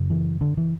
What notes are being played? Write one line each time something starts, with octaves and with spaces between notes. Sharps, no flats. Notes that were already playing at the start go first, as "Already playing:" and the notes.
Already playing: F#2 C#3
E3
D3
E3